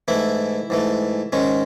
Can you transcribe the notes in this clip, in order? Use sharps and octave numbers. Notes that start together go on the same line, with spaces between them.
G#2 E3 A3 E4
G#2 E3 A3
G#2 D#3 G#3 C#4